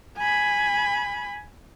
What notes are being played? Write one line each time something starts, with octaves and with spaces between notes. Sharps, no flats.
G#5 B5